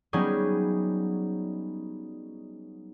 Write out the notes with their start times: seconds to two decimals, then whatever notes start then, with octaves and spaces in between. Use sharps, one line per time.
0.13 F#3 G3 B3 C#4 D#4 G#4